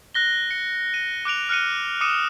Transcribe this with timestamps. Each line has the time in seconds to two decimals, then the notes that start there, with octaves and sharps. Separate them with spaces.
0.15 F#6 A#6 G7
0.51 C#7
0.94 D#7
1.25 D6 F#6 D7 F7
1.49 F6 F#6 C#7 D#7
2.01 D6 D#6 C#7 D#7 E7